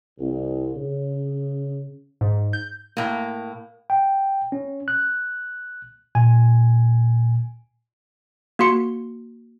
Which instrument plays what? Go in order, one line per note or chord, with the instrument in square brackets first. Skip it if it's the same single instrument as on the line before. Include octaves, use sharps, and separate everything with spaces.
[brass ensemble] C2
C#3
[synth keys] G#2
G6
[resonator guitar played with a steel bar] A2 A#3
[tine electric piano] G5
C#4
F#6
A#2 G#5
[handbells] A#3 F#4 C6 C#7